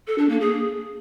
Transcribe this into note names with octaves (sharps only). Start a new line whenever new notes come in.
A4
D4
A#3
G#4